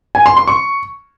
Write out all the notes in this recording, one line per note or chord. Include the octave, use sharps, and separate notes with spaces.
G#5
C6
C6
C#6